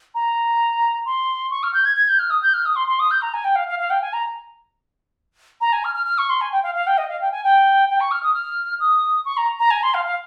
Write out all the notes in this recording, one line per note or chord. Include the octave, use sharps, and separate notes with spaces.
A#5
C6
C#6
F6
G6
G#6
G#6
G6
F6
D#6
G6
F6
D#6
C6
C6
D#6
G6
A#5
G#5
G5
F5
F5
F5
G5
G#5
A#5
A#5
G#5
F6
F6
F6
C#6
C6
G#5
G5
F5
F5
G5
D#5
F5
G5
G#5
G5
G5
C#6
F6
D#6
F6
D#6
C#6
A#5
A#5
G#5
C6
F5
F5